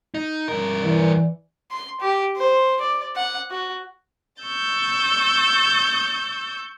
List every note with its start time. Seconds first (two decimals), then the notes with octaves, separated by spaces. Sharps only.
0.15 D#4
0.48 G2 A#4
0.83 E3 D5
1.71 C6
2.01 G4
2.37 C5
2.81 D5
3.16 F#5
3.51 F#4
4.43 C#6 E6 G6 A6